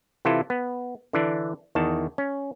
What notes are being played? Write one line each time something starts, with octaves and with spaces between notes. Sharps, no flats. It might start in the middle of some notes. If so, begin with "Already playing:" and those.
C3 E3 E4 F4 A4
B3
D3 E3 D4
E2 D#3 A5
C#4